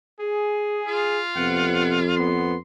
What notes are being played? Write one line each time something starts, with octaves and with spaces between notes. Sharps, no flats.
G#4
F4
F2 C3 B3 F#5
B3 C6